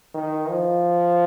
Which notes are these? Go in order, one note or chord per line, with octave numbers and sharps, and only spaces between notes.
D#3
F3